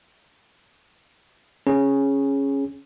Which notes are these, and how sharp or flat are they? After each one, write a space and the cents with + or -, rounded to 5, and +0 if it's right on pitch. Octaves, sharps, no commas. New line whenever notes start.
C#4 -10 G#4 +0